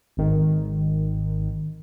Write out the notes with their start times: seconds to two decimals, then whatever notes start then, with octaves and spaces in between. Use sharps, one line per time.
0.17 G#1 D#3